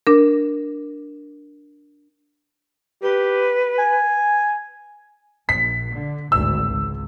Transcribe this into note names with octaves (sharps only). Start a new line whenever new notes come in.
D4 A#4
G4 B4
G#5
A#1 B6
D3
G#1 D2 A2 E6
C#2